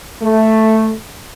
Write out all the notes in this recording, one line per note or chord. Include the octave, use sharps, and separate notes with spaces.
A3